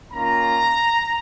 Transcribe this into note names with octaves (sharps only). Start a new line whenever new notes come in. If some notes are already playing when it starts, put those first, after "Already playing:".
D#3 A#3 C#4 F4 A#5